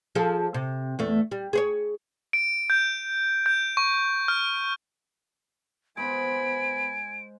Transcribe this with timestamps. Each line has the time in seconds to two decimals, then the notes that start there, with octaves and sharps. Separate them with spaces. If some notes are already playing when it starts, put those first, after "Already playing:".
0.15 F3 G#4 A4
0.54 C3
0.99 E2 A3
1.31 G3
1.53 G#4 C5 C#5
2.33 D7
2.70 G6
3.46 G6
3.77 C#6
4.28 F6
5.97 G#3 B3 C5 G#5 B5 D7